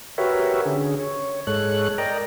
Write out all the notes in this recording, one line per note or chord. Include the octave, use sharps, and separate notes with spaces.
F#4 G4 A#4 B4 C#5 E5
D3 C#4 G#4
C#5
G#2 G#3 A4 C#5 F#6
A#4 D5 D#5 G5 A#5